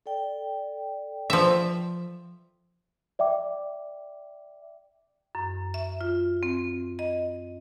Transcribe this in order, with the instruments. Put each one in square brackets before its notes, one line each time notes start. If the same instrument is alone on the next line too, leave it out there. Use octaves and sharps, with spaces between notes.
[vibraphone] A4 D5 G5
[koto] F3 E5
[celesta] D5 E5 G5 D6
[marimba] F#2
E5
F4
C4
D#5